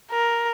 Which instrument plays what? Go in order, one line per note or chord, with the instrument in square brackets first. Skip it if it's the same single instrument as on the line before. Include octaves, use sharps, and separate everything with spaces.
[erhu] A#4